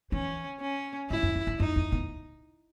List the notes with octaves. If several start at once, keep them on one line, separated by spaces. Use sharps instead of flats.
E3 C#4
C#4
G#2 E4
F#2
E2
F#2
F#2 D#4
E2
B2